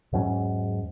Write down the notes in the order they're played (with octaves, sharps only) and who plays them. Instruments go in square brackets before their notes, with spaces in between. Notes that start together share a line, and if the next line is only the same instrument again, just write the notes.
[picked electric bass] E2 G#2 F#3 C#4